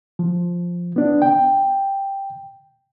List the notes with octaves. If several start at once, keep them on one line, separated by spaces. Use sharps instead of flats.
F3
B3 D4
G5